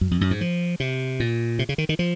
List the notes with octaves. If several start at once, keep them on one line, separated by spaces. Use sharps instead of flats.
F#2
F2
F#2
G#2
F3
C3
A#2
C3
C#3
D#3
D#3
F3